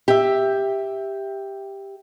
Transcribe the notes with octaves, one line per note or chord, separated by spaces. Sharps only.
G4 E5